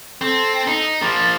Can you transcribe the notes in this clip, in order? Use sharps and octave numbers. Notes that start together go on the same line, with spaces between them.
C4 A4
D#4
F3 A#3 A6